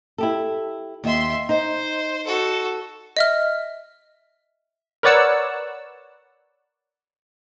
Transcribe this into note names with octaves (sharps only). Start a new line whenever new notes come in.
E4 G4 A4
D#2 E5 C6
D#4 C5
F#4 A4
D#5 E5 F6
A#4 B4 C#5 D5 F#5 E6